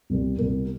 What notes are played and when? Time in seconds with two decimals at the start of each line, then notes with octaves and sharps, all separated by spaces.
0.10 C2 B2 G3 A#3
0.38 C2 B2 G3 A#3